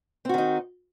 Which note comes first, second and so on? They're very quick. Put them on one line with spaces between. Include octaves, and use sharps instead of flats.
C4 F#4 D#3 D#4